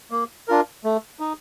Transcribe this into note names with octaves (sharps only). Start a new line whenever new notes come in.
A#3
D4 F4 A#4
A3
D#4